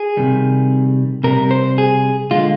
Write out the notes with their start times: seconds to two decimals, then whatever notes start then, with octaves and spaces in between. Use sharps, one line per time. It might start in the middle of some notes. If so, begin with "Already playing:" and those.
Already playing: G#4
0.17 C3 D#3 G3
1.24 C3 G3 A#4
1.51 C5
1.78 G#4
2.31 D3 G#3 F4